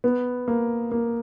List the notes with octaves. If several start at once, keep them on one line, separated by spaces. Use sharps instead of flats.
B3
A#3
A#3